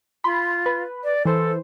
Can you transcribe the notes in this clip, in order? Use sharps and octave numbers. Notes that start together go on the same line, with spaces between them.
F4 B5 C6
B4
D5
E3 A4 C5